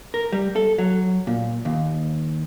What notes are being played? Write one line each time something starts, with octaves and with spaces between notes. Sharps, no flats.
A#4
G3
A4
F#3
A#2
D#2